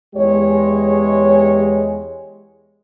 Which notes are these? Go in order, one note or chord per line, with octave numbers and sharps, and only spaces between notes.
E2 G#3 G4 C#5